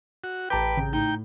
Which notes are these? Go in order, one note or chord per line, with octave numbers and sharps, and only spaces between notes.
F#4
A1 B4 G5 A5 A#5 D6 G6
C#3
A2 D#4 G5